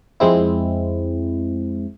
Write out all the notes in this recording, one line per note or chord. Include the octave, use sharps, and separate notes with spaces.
F2 G#3 C4 E4